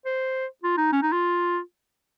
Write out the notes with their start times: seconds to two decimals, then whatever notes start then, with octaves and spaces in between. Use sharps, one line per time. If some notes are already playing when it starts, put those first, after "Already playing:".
0.06 C5
0.63 F4
0.78 D#4
0.92 C#4
1.02 D#4
1.12 F4